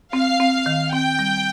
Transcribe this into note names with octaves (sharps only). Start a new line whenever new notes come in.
C4 F5
C4
D#3
C4 G5
G3